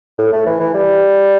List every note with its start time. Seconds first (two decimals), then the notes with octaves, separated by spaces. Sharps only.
0.18 A2
0.33 A3
0.47 E3
0.60 E3
0.74 G3